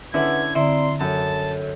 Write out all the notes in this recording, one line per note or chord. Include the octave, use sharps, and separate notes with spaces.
D3 C#4 E4 G#4 B4 E5 F#5 G#6
D3 C4 E4 D5 E5 A#5 C6 C#7
F#2 A4 C#5 A5